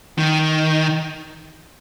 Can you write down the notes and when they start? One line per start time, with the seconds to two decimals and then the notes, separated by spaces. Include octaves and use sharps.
0.18 D#3